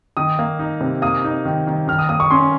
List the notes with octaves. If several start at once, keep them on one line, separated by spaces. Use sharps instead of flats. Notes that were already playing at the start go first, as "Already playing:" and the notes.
D#3 D#6
A#3
D#4
C3
A#3 D#6
D#4
D#3
D#3
D#3 F6
D#6
A#3 D#6
C#6
C#4 C6